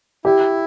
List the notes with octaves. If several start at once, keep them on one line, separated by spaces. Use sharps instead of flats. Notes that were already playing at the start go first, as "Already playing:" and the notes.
E4 G4